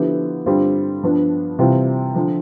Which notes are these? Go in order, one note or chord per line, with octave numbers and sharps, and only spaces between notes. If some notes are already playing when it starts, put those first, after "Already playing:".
Already playing: D3 F3 B3 E4 G4
G2 D3 G3 C4 F4
G2 F3 B3 D4
C3 E3 G3 C4 F4
D3 F3